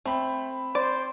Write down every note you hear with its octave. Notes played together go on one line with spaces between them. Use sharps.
A3 C4 B5
C5 D5